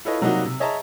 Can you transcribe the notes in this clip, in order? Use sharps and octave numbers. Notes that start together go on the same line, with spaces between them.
E4 F4 A4 B4 C#5 D#5
C3 F#3 G3 A#3 D#4 F#4
C3
G#4 C#5 D#5 E5 A5 A#5